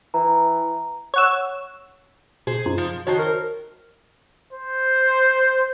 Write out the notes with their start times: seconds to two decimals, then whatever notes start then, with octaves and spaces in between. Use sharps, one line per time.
0.14 E3 A#5
1.14 C#5 F#5 E6
2.47 B2 G#4 C5
2.66 F#2 D#4 F4
2.78 F3
3.07 D#3 F#4 C5 C#5 A5 A#5
3.19 A#4
4.53 C5